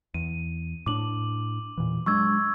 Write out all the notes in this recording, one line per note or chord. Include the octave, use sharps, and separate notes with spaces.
E2 D#7
A2 D4 D6 F#7
E2 A#2 E3
F#3 G#3 D4 C#6 E6 G#6